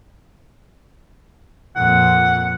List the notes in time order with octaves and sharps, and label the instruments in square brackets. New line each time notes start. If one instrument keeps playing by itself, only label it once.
[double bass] F2 A#2 [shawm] F#5